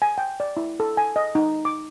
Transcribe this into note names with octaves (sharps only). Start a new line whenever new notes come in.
G#5
G5
D5
E4
A4
G#5
D#5
D#4
D6